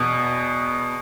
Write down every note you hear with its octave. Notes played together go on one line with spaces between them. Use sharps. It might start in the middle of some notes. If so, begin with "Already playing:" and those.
Already playing: E2 B2 B3